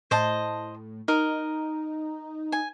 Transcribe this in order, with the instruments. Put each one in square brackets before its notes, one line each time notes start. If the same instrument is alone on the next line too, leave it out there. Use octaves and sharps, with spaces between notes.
[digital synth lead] A2 [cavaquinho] C5 D#5 A5
[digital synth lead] D#4 [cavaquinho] A#4 D#5
[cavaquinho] G#5